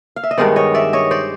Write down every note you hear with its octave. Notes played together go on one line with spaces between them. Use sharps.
F5
E5
D#5
G2 D#3 G#3 B3 C5 D5
C#5 D#5
D5 E5
C#5 D#5
C5 D5